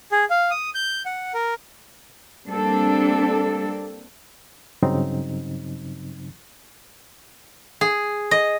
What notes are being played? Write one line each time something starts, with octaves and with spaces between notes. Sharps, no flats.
G#4
F5
D#6
G6
F#5
A#4
G3 A#3 C4 D4 A4
G2 C#3 F#3 C4 D#4
G#4
D#5